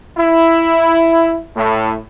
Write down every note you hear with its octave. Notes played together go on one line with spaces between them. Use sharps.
E4
A2